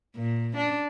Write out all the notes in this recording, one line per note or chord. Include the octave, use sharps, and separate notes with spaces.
A#2
D4